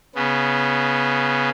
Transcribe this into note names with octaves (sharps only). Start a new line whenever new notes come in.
C#3 B3